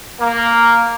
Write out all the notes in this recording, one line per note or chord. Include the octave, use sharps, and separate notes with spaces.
A#3